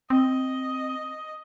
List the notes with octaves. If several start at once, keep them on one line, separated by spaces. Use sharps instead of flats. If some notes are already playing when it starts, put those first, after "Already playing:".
C4 D#5